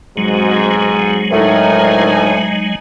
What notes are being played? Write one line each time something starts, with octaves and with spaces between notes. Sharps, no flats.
B1 G#2 F#3 G#3 C4 F#4
D2 A2 D#4 A#4 G#5